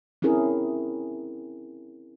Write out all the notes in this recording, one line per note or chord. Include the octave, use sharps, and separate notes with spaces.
C4 C#4 E4 G#4 A#4